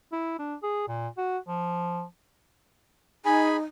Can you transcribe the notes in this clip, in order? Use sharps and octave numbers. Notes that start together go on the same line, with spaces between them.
E4
D4
G#4
A#2
F#4
F3
D#4 G#4 G#5 B5